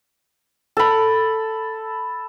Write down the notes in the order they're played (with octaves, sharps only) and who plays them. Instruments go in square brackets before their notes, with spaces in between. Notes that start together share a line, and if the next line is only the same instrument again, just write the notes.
[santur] A4 B5